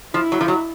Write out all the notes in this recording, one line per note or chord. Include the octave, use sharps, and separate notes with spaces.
F3 E4
F#3
F3
F#3